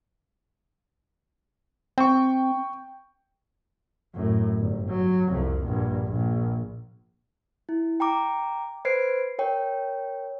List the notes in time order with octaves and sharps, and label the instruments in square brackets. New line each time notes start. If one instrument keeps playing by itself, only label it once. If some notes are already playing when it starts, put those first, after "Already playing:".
[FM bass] C4 [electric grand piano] G5 C#6
[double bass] F#2 A2
G1
F#3
C2 F2
A#1 G2
A#1
[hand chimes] E4
G5 A#5 D6
B4 C5 G#6 C7 D7
A#4 C#5 G5